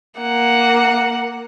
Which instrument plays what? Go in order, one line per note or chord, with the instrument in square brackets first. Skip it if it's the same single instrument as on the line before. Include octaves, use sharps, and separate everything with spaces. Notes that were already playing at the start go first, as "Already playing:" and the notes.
[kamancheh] A#3 F#5